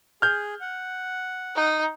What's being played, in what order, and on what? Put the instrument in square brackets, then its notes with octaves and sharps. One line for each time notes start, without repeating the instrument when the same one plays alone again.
[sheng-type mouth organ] G#4 [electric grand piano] F6 G6
[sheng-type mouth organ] F#5
[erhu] D#4